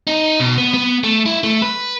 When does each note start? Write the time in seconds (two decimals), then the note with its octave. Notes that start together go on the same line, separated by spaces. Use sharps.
0.07 D#4
0.40 B2
0.58 B3
0.74 B3
1.04 A3
1.26 E4
1.44 A3
1.62 B4